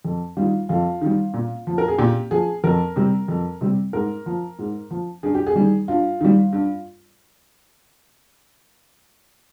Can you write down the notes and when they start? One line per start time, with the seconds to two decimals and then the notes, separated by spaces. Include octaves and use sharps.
0.05 F2
0.37 D#3 G3 F4
0.69 F2 F4
1.01 D#3 G3
1.34 A#2
1.67 F3
1.78 A#4
1.88 G#4
1.98 A#2 G4
2.31 F3 G#4
2.64 F2 A#4
2.96 C3 G3
3.28 F2
3.61 C3 G3
3.93 G#2 A#4
4.26 F3
4.59 G#2
4.91 F3
5.23 G2 G#4
5.34 G4
5.47 G#4
5.56 D#3 G3
5.88 G2 F4
6.21 D#3 G3
6.53 G2